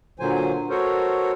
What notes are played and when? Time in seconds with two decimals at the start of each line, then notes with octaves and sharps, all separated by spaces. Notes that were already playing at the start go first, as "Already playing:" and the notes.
0.19 A#2 D3 F#3 C5 G#5
0.70 F#4 A4 A#4 C5 C#5